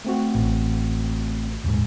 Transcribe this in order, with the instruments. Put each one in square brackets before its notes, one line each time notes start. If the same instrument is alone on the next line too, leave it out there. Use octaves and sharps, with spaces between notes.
[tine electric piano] A3 C4 F#4
[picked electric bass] A1
D#1 G#2